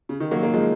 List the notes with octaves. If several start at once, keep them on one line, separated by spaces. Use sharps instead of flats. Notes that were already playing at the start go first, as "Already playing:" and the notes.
C#3
D#3
F#3 A#3
F#3 A#3
F3 G#3